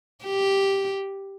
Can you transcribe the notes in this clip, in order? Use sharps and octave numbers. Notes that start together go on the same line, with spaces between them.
G4